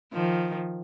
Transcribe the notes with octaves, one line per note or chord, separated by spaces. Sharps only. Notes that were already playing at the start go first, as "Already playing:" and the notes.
D#3 F3